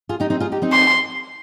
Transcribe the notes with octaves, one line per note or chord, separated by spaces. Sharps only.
F4 G#4
D#4 G4
C4 D#4
F4 G#4
D#4 G4
C4 D#4
C6